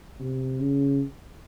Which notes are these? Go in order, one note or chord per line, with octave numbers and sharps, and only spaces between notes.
C3
C#3